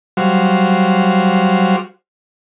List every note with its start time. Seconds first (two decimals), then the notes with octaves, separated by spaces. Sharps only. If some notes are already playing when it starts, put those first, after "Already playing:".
0.17 F#3 G3 F#4 C5 F5